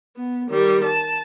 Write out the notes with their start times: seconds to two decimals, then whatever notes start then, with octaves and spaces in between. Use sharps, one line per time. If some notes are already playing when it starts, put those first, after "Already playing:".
0.17 B3
0.50 D#3 G3
0.83 A5